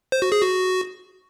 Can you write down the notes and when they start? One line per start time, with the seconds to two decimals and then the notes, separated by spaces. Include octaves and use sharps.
0.12 C5
0.22 F#4
0.32 G#4
0.42 F#4